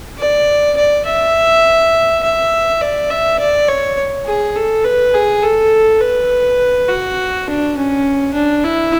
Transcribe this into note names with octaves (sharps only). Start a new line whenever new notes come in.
D5
D5
E5
E5
D5
E5
D5
C#5
G#4
A4
B4
G#4
A4
B4
F#4
D4
C#4
D4
E4